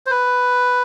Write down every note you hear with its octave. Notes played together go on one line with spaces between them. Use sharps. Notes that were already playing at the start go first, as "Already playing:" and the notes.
C5
B4